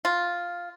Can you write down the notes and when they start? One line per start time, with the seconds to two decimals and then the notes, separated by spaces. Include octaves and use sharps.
0.05 F4